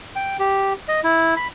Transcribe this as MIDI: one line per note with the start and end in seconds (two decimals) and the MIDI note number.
0.16 0.37 79
0.39 0.73 67
0.88 1.00 75
1.04 1.34 64
1.36 1.47 83